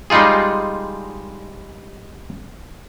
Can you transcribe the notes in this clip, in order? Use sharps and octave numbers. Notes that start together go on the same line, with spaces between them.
G3 G#3 D#4 F4 G#4